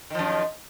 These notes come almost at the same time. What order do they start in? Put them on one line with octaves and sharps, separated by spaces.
D#3 F3 F#2